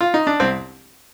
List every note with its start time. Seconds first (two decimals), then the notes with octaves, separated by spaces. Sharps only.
0.01 F4
0.14 D#4
0.27 D4
0.40 C2 C4